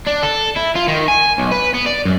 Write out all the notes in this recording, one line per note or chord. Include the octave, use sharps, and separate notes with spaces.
D4
A4
E4
F4
D#3
G#5
B1
B4
B3
D5
F#2